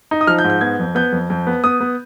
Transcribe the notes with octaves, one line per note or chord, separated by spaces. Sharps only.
D#4
D#6
F3 F6
G6
G#2
G6
B3 G#6
F2
B3 G6
F2
F2
B3
B3 D#6
B3